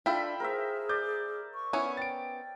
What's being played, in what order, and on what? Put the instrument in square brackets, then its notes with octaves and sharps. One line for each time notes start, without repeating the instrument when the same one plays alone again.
[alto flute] D4 [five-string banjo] E4 F4 [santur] A4 E5 B5 [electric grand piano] G5
[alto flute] G#4 [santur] A#4 C5 E5
[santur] D5 [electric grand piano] G6
[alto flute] C#6
[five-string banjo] B3 C#4 E4 [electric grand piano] G#5
[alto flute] G5 [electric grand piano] A6 D7